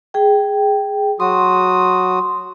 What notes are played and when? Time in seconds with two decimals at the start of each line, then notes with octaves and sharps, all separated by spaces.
0.14 G#4 G5
1.20 F#3 F#4 C6 D#6